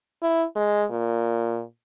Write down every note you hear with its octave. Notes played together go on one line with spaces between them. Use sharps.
E4
G#3
A#2